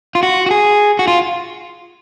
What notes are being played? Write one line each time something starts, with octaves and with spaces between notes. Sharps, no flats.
F4
F#4
F#4
G#4
F#4
F4